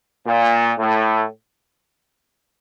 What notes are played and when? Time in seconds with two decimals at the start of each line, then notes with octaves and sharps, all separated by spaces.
0.27 A#2
0.78 A2